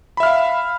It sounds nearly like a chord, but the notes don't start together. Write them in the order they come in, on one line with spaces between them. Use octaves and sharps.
B5 E5 F6 F5